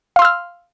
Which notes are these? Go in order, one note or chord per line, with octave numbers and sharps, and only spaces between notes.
F5 C6 E6 F6